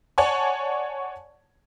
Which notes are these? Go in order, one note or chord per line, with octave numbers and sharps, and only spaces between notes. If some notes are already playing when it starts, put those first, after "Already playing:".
C#5 D5 F#5 G#5 A5 C#6